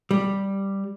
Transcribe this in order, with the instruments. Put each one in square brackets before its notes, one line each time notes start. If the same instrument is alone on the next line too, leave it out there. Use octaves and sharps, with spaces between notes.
[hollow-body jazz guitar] G3